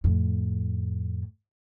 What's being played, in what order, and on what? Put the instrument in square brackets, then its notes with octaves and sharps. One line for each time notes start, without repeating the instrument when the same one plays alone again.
[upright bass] F2 A2